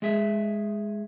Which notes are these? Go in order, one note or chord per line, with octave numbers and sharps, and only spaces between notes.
G#3 G#4 E5